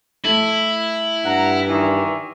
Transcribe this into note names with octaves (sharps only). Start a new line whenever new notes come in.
A3 E4
G2 F#5 A#5
D#3 E3